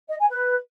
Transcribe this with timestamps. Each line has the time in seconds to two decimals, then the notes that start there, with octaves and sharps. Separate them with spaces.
0.08 D#5
0.18 G#5
0.28 B4